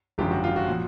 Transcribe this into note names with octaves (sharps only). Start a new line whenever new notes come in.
G#1 F#2 D3 F3 G4
F#4
F4
F#4
A#2 F3